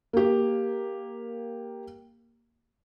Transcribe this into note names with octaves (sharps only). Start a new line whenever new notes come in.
A#3 G4